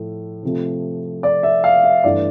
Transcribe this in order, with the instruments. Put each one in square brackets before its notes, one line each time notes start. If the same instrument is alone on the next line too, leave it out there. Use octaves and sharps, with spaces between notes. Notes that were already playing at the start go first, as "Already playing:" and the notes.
Already playing: [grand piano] A2 F3 A3
C3 F3 A3
D5
E5
F5
E5
G2 E3 A3 D5